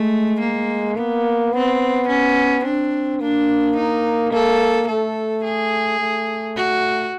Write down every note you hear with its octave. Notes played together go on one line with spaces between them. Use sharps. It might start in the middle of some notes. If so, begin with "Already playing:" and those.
Already playing: G#3 A3
A#3
A#3 B3
B3 C4
C#4
C4 D4
A#3 D4
D#4
A#3 A4
A3 A4
G#4
A3
F#4